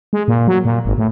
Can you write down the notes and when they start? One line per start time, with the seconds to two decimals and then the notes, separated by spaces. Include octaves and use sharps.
0.13 G#3
0.28 A#2
0.48 F#3
0.65 A#2
0.85 G#1
0.98 A2